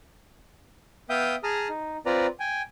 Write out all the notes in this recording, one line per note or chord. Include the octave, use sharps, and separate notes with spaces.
B3 E5 F5 G5 D#6 G6
G#4 A5 A#5 D#6 F6
D#4
C4 F4 B4 D5 A#5
G5 G#5